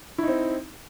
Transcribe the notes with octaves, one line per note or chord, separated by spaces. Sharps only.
C4 D#4 E4